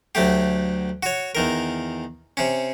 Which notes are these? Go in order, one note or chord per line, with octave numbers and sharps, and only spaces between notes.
D2 F#3 A3 G4
F#4 C#5
E2 D#3 A#4
C3 C#4